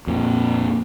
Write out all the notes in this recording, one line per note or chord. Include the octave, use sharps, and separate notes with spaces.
F2 A#2 F3